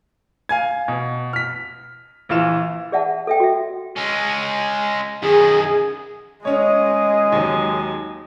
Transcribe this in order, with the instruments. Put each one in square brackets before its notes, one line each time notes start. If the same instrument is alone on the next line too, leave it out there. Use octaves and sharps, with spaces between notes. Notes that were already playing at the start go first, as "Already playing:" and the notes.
[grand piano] F5 G#5 G#6
B2
F6 B6
A#1 E3 F4 F6 E7
[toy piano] G#4 D5 E5 F#5 A5
A4 E5 G5
F#4 E5
[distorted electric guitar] G#3 C#4
[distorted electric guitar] F#2 D#3 [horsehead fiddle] G#4
[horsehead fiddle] G#3 D#5 [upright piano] C#4 C#5
[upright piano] D#2 F#3